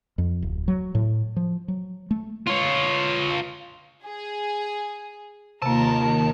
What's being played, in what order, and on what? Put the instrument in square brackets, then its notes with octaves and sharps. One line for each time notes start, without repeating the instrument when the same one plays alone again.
[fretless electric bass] F2
D1
F#3
A2
F3
F#3
A3
[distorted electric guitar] F4 C#5
[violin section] G#4
[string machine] D#2 D#3 [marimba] C3 A#3 [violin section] F4 A#4 [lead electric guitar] A5